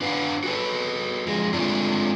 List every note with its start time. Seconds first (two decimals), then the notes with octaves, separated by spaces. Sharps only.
0.01 D4 B4 F5 F#5
0.43 F#4 A4 B4
1.27 F2 G#3
1.53 G#3 A3 C4 D4 F4